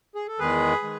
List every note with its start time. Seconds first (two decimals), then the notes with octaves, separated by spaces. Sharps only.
0.15 G#4
0.28 A4
0.39 E2 D#3 G#3 G#4 B4
0.83 D#3 G#3